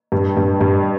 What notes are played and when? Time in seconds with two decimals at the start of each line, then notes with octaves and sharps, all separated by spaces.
0.12 G2
0.37 G2
0.61 G2